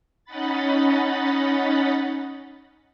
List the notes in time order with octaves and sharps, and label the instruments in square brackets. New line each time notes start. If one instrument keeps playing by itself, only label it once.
[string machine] C#4 D#4 D#5 F#5 B5 A6